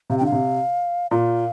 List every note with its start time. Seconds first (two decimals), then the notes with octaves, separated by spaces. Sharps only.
0.10 C3 F5
0.18 G5
0.21 D3 F5
0.32 C3
1.11 A#2 F5